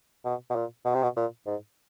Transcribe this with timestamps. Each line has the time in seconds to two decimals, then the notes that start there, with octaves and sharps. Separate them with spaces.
0.25 B2
0.50 B2
0.55 A#2
0.85 B2
0.94 C3
1.03 B2
1.16 A#2
1.46 G#2